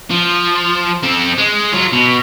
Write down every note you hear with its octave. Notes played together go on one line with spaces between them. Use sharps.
F3
C4 A4
G#3
F#3 F4
B2